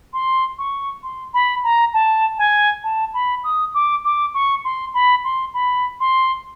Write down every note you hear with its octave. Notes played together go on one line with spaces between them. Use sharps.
C6
C#6
C6
B5
A#5
A5
G#5
A5
B5
D#6
D6
D6
C#6
C6
B5
C6
B5
C6